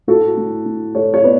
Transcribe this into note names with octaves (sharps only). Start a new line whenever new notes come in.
A2 F#4 A4
A2
A2
A2 A4 C#5
C#5
B3 B4 D5